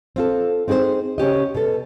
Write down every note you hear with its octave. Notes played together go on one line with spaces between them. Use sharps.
C4 F4 A4
C4 D#4 G#4 B4 C5
C#3 C#4 G4 D#5
B2 A4